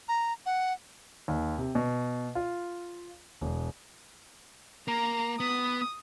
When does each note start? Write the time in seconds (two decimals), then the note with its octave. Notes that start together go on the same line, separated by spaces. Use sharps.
0.08 A#5
0.46 F#5
1.28 D#2
1.58 C3
1.75 B2
2.35 F4
3.41 E1
4.88 A#3 A#5
5.40 B3 D#6